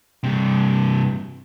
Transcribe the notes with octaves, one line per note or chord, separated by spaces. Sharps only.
G2 C3